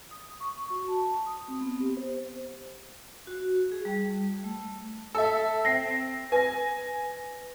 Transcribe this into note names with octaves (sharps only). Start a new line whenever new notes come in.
D#6
C#6
F#4
A5
D#6
C4
B3
G4
C5
F#4
G#4
G3
A3
A4 E5
C4 A#6 C7
B4 G#5 A#6